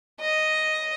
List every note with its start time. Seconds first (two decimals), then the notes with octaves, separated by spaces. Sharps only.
0.21 D#5